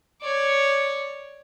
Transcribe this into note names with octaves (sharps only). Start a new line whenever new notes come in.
C#5 D5